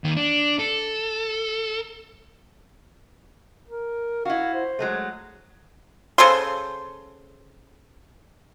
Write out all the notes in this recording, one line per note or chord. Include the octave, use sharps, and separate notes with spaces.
D#2 D#3
D4
A4
A#4
E4 F#4 F5
C5
F#3 G#3 A3
C#3 A4 C5 C6